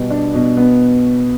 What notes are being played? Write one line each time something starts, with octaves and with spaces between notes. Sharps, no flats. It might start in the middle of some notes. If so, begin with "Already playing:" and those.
Already playing: B2 G3 B3
D4
B2
B3